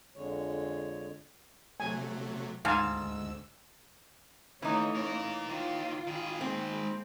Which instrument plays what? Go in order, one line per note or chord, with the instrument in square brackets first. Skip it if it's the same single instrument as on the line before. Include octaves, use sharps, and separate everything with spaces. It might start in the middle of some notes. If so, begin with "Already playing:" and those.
[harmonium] F2 D3 G#3 C#5
[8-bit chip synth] C3 F#3 A3 [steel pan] G#5
[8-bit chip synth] D2 E6 [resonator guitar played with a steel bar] G#2 [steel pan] F5 G#5 A5
[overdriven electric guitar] D#2 [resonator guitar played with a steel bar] E3 D#4 [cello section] A3 C#4 C#5
[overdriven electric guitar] F4 A#4
[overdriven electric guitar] D#2 D#3 [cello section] F4
[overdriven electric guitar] D#3 G#4
[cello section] G#3 A#3 [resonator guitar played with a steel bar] C4